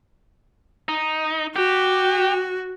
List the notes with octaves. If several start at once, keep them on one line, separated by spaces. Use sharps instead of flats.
D#4
F#4 G4